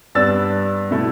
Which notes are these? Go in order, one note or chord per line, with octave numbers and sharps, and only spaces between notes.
G2 G3 B3 D4 E6 A6
B2 A3 E4